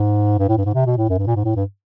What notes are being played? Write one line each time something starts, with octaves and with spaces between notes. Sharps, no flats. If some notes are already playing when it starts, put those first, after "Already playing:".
Already playing: G#2
G2
A2
G2
G#2
C3
B2
A2
F#2
G2
A#2
G#2
A2
G2